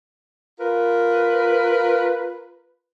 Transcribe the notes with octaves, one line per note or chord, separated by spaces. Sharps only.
F4 A#4 B4